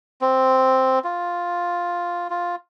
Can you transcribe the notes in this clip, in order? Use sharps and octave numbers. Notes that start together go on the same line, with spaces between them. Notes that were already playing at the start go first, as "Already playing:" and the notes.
C4
F4
F4